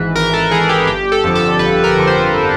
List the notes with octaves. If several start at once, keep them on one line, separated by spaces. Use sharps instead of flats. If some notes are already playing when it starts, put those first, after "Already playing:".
Already playing: G#1 G#2 E3 B4
G#1 A#4
A4
G#2 E3 G#4
G4
G1 G4
A4
F2 D3 F3
A4
G1 B4
A#4
F2 D3 F3
C5